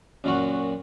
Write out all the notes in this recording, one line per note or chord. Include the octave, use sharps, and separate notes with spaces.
F#2 A#2 F#4